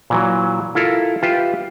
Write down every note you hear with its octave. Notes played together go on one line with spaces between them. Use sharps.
A#2 E3 F#3
E4 F4 A4 A#4
F4 G4 B4 E5 G5